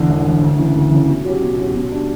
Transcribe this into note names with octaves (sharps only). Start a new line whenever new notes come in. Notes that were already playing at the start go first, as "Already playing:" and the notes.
Already playing: E2 D3
E1
E2 D3
D2
C#3 E3
D2
C#3 E3
B2
F#3 C#4 G4
B2
F#3 C#4 G4
B2
G3 D4